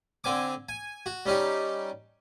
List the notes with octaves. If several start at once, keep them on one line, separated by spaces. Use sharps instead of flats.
D3 C4 G#5 D6
G#5
F#4
G3 C#4 D#4 G4